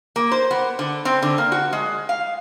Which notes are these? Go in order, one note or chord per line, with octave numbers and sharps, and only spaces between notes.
A#3
C5
B3
D3
C4
D3
A#3
F#4
G#3
F5